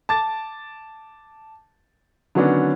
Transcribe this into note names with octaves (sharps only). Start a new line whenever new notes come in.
A5 D6 A6
D3 D#3 F#3 B3 C#4 D4